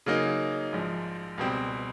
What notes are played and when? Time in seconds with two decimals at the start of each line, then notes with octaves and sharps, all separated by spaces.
0.06 C#3 F#3 A#3 D#4
0.72 A#1 G#2 F3
1.38 C#2 B2 G3 C4